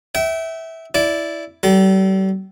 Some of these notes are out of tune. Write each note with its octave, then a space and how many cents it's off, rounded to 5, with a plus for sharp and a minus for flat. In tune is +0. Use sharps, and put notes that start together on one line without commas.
E5 -15 G5 -35
E4 +0 D5 -10
G3 -40 A4 +0